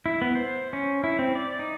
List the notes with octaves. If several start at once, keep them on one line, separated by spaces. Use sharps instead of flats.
E4
B3
C5
C#4
E4
C4
D5
D#4